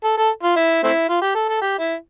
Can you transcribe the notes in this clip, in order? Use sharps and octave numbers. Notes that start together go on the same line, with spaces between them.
A4
A4
F4
E4
A3 C4 E4
F4
G4
A4
A4
G4
E4